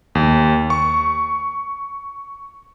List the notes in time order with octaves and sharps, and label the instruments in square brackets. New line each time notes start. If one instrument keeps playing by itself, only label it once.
[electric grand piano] D#2
C#6